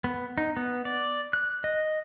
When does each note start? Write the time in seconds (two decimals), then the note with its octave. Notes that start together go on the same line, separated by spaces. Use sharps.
0.04 B3
0.38 D#4
0.57 B3
0.85 D5
1.33 F#6
1.64 D#5